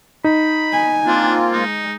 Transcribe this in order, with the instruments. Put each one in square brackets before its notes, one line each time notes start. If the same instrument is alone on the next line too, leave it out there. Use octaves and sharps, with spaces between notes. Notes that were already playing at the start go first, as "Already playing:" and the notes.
[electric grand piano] D#4 [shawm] B5
[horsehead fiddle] G#5
[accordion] A#3 C4 F4 [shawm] D4
[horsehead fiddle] G#3 [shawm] D#4